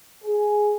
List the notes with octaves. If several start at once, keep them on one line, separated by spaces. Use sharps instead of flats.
G#4